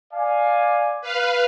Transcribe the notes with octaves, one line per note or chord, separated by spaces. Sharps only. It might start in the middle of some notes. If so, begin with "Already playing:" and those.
D5 F5 G#5
B4 F5